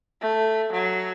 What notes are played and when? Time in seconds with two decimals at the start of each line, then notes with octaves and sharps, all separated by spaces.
0.21 A3
0.72 F#3